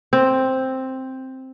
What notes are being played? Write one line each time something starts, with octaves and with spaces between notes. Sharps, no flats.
C4